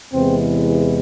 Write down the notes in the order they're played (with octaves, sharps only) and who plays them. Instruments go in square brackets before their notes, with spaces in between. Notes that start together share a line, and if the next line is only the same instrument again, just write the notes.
[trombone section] E2 C3 E3 G#3 B3 C4